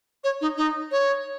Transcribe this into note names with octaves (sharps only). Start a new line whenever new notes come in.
C#5
D#4
D#4
C#5